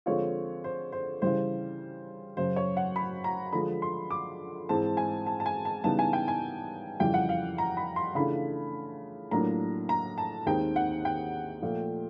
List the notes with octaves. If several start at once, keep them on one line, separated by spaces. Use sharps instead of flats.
D3 F3 G#3 C4 F4 C#5
C5
C5
C#3 E3 G3 C5
F#2 C#3 F#3 C5
C#5
F#5
B5
A#5
D3 F3 G#3 B5
C6
D6
G#2 E3 G#3 C4 A5
G#5
A5
A5
G#5
A5
C#3 E3 G3 B3 D#4 A5
G#5
G5
G#5
F2 C#3 E3 G3 G5
F#5
F5
A#5
B5
C6
C#3 E3 A3 D4 F4 B5
A2 F#3 A#3 D4 F4 A#5
A#5
A5
D#2 D#3 G#3 C4 D#4 G5
F#5
G5
A#2 F3 A3